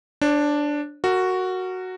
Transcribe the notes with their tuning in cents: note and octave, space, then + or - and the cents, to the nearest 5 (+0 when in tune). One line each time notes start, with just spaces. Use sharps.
D4 +0 C#5 -45
F#4 +0 A#4 -25